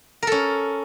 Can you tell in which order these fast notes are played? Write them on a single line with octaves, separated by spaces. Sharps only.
A#4 A4 C#4